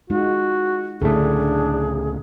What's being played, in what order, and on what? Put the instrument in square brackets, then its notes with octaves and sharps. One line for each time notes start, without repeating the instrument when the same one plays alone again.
[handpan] G#3 D#4 F4 [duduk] F#4
[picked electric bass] C#2 A2 A3 [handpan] D3 A4 [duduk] D4 [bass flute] G#4